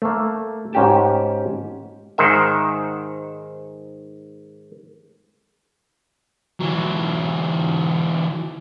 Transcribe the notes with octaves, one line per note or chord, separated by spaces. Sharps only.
A3 A#3
G#2 C#4 F#4 G4 G5 A5
G#2 D#3 C5 E5
E3 F#3